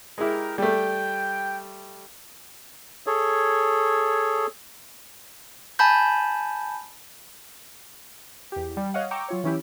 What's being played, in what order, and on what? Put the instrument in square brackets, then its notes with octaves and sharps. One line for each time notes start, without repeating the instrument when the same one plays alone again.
[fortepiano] G#3 E4 [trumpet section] G4 A#4
[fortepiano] G3 A3 [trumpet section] G5
[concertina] G#4 A4 C#5
[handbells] G#5 A5 B5 G6
[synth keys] E2 G4
G3
C#5 D#5 F5 F#5
G5 A#5 C#6 D6 E6
F#3 F4 C#5
E3 C#4 E4 G4